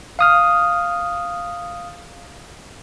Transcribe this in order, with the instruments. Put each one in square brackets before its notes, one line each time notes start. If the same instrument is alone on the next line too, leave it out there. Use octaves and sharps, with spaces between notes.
[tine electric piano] F5 D#6 F6